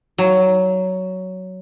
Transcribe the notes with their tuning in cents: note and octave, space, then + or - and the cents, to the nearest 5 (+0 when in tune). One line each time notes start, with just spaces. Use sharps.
F#3 +10